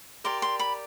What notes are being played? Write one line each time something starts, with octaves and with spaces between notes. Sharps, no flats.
G4 A#4 D5 C6
C6
B5